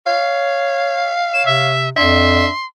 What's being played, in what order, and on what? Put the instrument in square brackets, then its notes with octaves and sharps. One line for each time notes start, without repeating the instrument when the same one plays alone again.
[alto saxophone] C#5 [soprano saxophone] F5
[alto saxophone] C#5 [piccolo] E7
[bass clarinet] C3 [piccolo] E5
[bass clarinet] F2 [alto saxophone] D4 [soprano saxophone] E5 [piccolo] C6